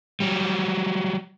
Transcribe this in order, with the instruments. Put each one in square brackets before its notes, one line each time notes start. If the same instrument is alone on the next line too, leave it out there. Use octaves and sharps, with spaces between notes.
[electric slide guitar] F#3 G3